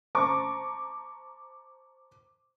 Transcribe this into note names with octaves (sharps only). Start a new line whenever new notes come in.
C5 A5 A#5 C#6 D6